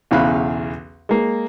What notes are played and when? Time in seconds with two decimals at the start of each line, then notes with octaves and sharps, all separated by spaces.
0.11 B1 E2 C#3 F5 B5 F#6
1.09 G#3 A#3